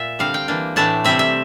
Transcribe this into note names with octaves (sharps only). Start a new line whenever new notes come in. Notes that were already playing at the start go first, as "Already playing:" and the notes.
Already playing: A#2 E5
D3 G3 C4 F5
G5
E3 A#3 D4
A2 E3 A3 D4 A5
C3 G3 C4 E5
E5